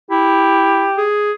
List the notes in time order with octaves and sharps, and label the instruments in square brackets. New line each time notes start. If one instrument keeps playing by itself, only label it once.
[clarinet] E4 [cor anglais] G4
[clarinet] G#4